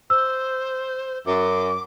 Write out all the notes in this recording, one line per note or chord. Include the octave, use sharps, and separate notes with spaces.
C5 E6
F#2 D6